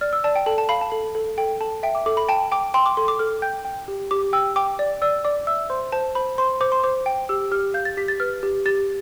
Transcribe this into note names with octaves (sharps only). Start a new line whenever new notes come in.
D5 F6
E6
D5 A5
G5
A4 A5
A5
F5 B5
A5
A4
A4
A4 G5
A4 A5
E5 G5
D6
A4 D6
B5
G5 A5
G5 D6
G5 C6
D6
A4 C6
D6
A4 F6
G5 G6
G5
G4
G4 D6
G5 E6
G5 D6
D5
D5 E6
D5 D6
E5 E6
C5 C6
C5 A5
C5 B5
C5 C6
C5 D6
C6
C5 D6
G5
G4 E6
G4 F6
F5 G6
A6
G4 B6
A6
B4 F6
G4
G4 A6